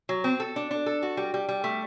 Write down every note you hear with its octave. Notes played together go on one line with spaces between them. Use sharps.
F#3
C4
A4
D4
D4
A4
F#4
G3
G3
G3
A3